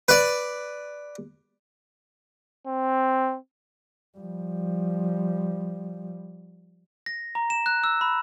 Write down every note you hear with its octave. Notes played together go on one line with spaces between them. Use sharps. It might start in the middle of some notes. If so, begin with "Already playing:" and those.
B4 D5
C4
F3 G3
A#6
A#5
E7
F#6
E6
B5